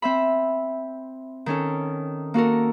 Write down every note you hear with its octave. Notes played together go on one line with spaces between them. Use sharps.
C4 E5 B5
D#3 C#4 A4
A#3 F#4 A4 A#4